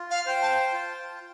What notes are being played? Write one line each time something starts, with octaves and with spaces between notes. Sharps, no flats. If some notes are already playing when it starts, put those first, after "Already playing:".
Already playing: F4
F5
C5 G5
A5
F4